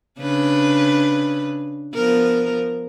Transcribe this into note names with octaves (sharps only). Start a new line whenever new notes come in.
C#3 D4 B4
F3 B3 A#4